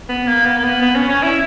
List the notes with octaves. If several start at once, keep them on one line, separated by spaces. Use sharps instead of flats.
B3
A#3
B3
A#3
B3
B3
C#4
C#4
E4